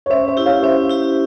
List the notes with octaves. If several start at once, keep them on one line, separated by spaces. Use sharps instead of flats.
C#5
C#4 C5 E5
C5 E5
E4 G4
C#5 F5
C#4 C5 E5
E4 G4